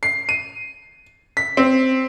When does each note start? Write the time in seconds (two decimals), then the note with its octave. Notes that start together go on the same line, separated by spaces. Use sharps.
0.03 C7
0.29 D#7
1.37 B6
1.57 C4